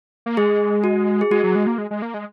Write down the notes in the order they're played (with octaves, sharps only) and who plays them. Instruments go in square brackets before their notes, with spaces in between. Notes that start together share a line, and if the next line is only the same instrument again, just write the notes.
[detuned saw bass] A#3
[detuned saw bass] G#3 [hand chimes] G#4
[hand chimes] F#4
G#4
[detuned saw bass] G#3 [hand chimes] F#4
[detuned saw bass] F#3
G#3
A#3
G#3
G#3
A#3
G#3